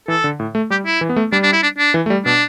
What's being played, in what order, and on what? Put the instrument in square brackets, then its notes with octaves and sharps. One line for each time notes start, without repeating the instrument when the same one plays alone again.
[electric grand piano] E3 [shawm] A4
[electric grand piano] D3
A2
A3
[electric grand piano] G3 [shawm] G4
[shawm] E4
[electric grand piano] E3
B3
A3
[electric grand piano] G3 [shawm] D4
[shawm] D4
E4
D4
D4
[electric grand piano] E3
A3
G3
[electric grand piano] B2 [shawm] D4